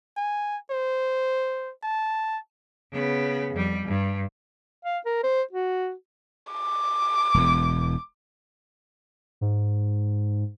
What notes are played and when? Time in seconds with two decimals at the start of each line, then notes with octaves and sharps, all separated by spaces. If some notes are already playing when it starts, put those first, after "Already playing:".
0.17 G#5
0.71 C5
1.83 A5
2.93 C#3 B3
3.53 F2 G3
3.86 G2
4.85 F5
5.06 A#4
5.24 C5
5.53 F#4
6.52 D6
7.34 E1 E2
9.41 G#2